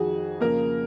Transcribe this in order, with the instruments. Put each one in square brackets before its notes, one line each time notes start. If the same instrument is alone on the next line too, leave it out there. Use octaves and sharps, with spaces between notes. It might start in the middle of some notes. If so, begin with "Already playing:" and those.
Already playing: [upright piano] F2 D#3 F#4 G#4
F2 C#3 A#3 A#4